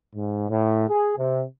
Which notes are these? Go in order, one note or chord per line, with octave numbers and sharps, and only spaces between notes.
G#2
A2
G#4
C3